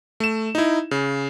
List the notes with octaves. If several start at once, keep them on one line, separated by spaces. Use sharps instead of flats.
A3 E7
D#4 E4
C#3